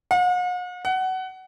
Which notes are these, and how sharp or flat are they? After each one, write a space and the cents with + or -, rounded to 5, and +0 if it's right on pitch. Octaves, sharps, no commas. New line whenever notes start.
F#5 -45
F#5 +20